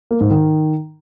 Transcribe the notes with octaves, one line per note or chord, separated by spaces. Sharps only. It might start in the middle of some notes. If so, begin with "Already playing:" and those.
A#3
G#2
D#3